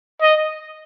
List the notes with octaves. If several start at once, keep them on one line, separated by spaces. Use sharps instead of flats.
D#5